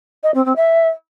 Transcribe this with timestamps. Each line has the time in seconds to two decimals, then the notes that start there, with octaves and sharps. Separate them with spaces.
0.23 D#5
0.34 C4
0.45 C4
0.56 E5